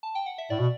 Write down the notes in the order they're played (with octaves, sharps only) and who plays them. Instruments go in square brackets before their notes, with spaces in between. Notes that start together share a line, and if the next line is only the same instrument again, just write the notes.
[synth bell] A5
G5
F#5
E5
[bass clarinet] A2 [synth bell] D5
[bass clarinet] B2